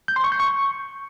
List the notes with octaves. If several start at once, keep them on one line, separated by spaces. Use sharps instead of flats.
G6
C6
C#6
G6
C#6